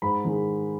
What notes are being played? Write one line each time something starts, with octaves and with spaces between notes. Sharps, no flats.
G#2 B5
D#3 G#3